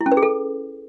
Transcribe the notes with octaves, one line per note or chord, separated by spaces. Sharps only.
E4
C#4
B4
G#4
A4